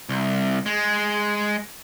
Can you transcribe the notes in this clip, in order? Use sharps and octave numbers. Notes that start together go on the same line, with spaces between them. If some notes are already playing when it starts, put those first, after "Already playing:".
C2
G#3